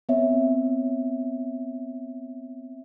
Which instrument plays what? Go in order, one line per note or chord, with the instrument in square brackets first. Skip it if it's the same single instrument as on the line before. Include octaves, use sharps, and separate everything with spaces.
[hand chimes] B3 C4 C#5 E5